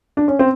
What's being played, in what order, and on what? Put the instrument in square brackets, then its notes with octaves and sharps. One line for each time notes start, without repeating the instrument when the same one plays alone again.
[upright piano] D4
C#4
C4